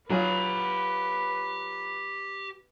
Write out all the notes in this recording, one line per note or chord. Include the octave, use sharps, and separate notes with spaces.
F#3 F4 G4 B4 G#5